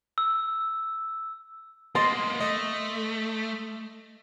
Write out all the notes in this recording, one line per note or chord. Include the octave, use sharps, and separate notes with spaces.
E6
A#3 B3 D#5 C6 A6
A3 D#5